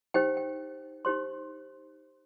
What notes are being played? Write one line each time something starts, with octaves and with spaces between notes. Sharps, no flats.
D#4 G4 C5 G5
G5
D#4 G4 C5 C6